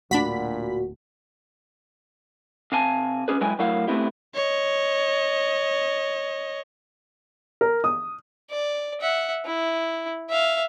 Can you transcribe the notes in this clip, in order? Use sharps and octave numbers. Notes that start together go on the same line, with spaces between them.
D1 A#2 D4 F#4 B5 B6
C3 F5 G#5 A5
C#4 G#4 B4
F#3 G#3 E4 B4 G5 G#5
F#3 A3 E4 A#4 F5 F#5
A3 B3 C4 E4 G4
C#5 D#5
A#4
D#6
D5
E5 F#5
E4
E5 F5